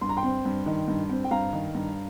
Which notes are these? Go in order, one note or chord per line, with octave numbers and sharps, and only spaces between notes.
G2 C6
A#5
G5 C6
C4
G2
D#3
G2
C4
G5
G2 F5 A#5
D#3
G2